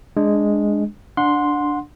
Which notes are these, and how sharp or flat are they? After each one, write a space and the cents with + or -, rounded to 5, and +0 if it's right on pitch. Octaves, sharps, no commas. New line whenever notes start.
G#3 +0 D4 +0
D4 +0 F#5 -25 C6 +0